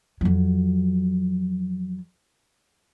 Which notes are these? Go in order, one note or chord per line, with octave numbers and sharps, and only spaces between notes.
F2 F#3